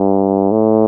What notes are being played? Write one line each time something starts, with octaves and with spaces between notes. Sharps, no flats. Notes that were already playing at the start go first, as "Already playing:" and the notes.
Already playing: G2
A2